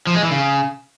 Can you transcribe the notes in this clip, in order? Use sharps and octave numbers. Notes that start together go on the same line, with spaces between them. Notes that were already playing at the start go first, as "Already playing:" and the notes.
F3
G#3
E3
C#3